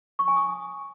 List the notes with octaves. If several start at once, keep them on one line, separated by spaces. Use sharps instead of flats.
C#6
G#5
D#6